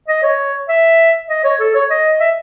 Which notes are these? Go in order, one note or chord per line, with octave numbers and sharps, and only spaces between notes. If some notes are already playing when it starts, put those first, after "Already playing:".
D#5
C#5
E5
D#5
C#5
A4
C#5
D#5
E5